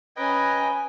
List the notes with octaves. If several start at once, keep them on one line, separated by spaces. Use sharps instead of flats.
C#4 B4 D#5 G5 G#5 A#5